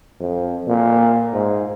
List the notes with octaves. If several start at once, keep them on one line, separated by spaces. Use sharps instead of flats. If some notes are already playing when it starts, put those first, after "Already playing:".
F2
A#2
G#2